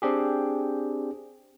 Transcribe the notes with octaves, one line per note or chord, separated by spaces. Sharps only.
C4 D4 G4 G#4